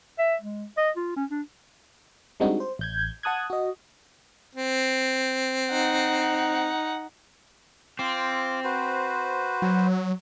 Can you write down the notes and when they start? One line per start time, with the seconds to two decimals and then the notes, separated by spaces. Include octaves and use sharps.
0.19 E5
0.42 G#3
0.77 D#5
0.97 F4
1.16 C#4
1.31 D4
2.40 G3 G#3 C4 D4 D#4 F#4
2.60 C5
2.79 A1 G6 G#6
3.23 F#5 A5 D#6 F#6 G#6
3.50 F#4 D#5
4.55 C4
5.70 D#4 F#5
7.99 C4 F4 D6
8.64 F#4 B4 C5
9.62 F#3